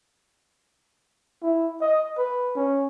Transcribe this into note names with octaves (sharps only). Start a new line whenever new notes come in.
E4
D#5
B4
C#4